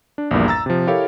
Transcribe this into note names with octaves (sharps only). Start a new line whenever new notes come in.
D4
A#1 E2 G2 A#2
A#5 E6 A6
C3 F3
E4 G4 A4 A#4 C#5 F5